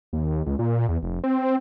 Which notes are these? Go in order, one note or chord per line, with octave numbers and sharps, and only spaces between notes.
D#2
C#2
A#2
E2
F1
C4